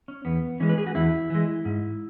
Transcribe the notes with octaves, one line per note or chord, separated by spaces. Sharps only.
C#4
E2 B3
E3 G#3 C#4
B4
G#4
F#4
E2 E4
E3 G#3
G#2